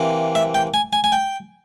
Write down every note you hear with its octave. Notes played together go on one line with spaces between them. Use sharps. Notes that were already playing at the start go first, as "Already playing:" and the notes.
Already playing: C3 E3 A#3
E5
G5
G#5
G#5
G#5
G5